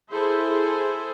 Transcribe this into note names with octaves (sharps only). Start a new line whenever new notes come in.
E4 G#4 A4 C5